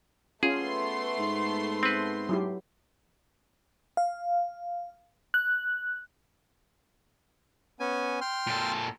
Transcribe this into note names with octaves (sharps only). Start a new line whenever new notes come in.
A3 B3 C#4 F4 G#4 C6
G#2
C4 B4
F#3 E4 G4
F5
F#6
B3 C#4 G#5
G5 C6 F6
A#2 A4